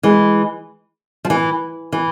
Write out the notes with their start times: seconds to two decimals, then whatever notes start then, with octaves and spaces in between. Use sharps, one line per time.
0.03 E3 G#3
1.25 F3
1.30 E3
1.92 E3